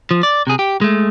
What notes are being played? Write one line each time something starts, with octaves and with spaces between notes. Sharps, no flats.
F3
D5
C3 G#4
G4
G#3 A3